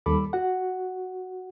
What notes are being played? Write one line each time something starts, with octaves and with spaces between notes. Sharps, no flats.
D#2 G3 A4 B5 D6
F#4 F#5